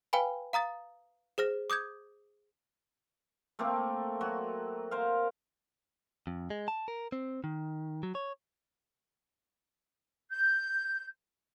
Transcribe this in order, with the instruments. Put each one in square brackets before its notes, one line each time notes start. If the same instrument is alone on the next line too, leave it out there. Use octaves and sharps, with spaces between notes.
[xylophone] B4 F5 G5 G#5 B5
F5 A#5 D#6 A6
G#4 C5 F6 A#6
D6 D#6 G6 G#6
[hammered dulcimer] A3 A#3 C4 A4
F#3 F#4
A#4 C5 F5
[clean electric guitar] F2
G#3
A5
A#4
C4
D#3
F#3
C#5
[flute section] G6